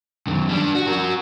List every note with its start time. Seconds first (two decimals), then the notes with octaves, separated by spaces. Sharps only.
0.27 F#2 D#3
0.49 G3 D4
0.75 F#4
0.87 F#4 A#4